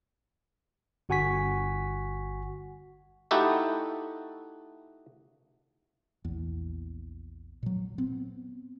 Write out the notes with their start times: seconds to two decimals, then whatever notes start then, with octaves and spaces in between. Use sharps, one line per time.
1.09 G1 F#4 F#5 G#5 C#6 B6
3.31 A3 D#4 E4 F#4 G4 A4
6.25 A#1 E2
7.63 A#2 F#3
7.98 B3 C4